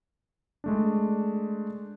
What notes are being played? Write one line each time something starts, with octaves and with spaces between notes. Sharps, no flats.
G#3 A3 D4